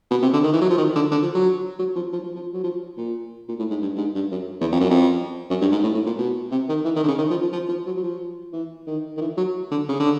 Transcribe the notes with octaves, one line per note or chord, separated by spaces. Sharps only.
B2
C3
D3
D#3
E3
F#3
F3
D#3
D3
D3
F3
F#3
F#3
F3
F3
F3
F3
F#3
F3
A#2
A#2
A2
G#2
G2
G2
G#2
G2
F#2
E2
F2
F#2
F2
F#2
G2
G#2
A2
A2
A#2
B2
C3
D#3
E3
D#3
D3
C#3
D#3
F3
F3
F3
F3
F#3
F#3
F3
E3
D#3
D#3
E3
F#3
D3
C#3
D3